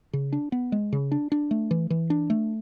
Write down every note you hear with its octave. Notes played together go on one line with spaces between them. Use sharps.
C#3
D4
B3
G#3
C#3
D4
D4
A3
E3
E3
D4
A3